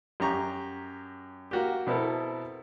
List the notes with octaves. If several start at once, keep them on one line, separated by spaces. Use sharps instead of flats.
F#2 G4 A#5 C#6
A#3 F#4 G4
B2 B3 C4 E4 A4 A#4